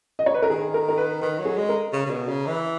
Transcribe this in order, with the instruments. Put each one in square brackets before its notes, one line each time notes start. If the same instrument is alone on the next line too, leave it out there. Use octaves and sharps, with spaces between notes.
[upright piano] D#5
C#5
B4
A#4
[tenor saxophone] D#3 [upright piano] G#4
[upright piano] A#4
A#4
B4
[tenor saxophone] D#3 [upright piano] B4
[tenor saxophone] F#3
[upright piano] G#4
[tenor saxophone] G#3
[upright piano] A#4
[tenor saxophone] C#3
C#3
B2
C#3
E3